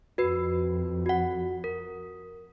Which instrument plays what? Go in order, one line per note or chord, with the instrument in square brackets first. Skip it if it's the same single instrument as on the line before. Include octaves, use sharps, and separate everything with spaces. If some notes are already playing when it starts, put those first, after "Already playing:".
[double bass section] F2 [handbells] F#4 B4
[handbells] F#4 F#5
A#4